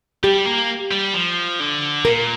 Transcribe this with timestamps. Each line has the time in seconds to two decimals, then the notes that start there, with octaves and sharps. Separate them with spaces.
0.24 G3 G4
0.46 A#3
0.91 G3
1.14 F3
1.60 D3
2.05 A#2 A#4